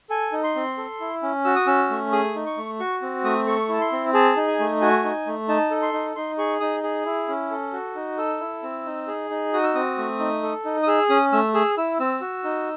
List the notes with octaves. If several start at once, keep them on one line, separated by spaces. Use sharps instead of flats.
A4 G#5
D#4
C6
C4
A4
E4
C#4
F#4 E6
D#6
C#4 E6
A3
G#4 D#6
D#4
C#6
A3
F#4 C#6
C4
A3 D#6
A4 C#6
E4 A5
C6
C4
G#4 A5
D#4
G#5
A3
F#4 G#5
D#4
A3
D#4 A5
A4
C6
D#4
D#4 C6
G#4 C#6
D#4 D#6
G#4
E4
C#4
A4
F#4
D#4
A4 E6
E4
C4
D#4
G#4
D#4
F#4 D#6
E6
C4 D#6
A3
D#4
A4
D#4
D#6
G#4 E6
C#4 D#6
A3 E6
G#4 E6
E4 E6
C4 E6
F#4
D#4